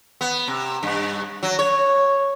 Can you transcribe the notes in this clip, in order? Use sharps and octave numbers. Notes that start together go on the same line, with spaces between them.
B3
C3
G2
F#3
C#5